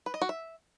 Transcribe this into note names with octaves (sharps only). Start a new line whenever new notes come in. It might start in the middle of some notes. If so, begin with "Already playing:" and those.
B4
D#5
F#4
E5